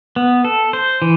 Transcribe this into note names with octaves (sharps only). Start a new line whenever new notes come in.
B3
A4
C5
E3